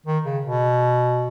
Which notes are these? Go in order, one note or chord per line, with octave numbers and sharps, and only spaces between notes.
D#3
C#3
B2